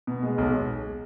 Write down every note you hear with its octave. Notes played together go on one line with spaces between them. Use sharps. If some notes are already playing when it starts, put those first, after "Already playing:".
B2
G#3
B1